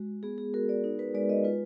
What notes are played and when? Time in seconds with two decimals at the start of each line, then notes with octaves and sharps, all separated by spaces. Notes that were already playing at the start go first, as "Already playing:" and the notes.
Already playing: G#3 F#4
0.23 B3 G#4
0.38 G#4
0.54 F#4 A#4
0.69 D5
0.84 D#4
0.99 B4
1.14 G#3 D5
1.29 D#5
1.44 F4 B4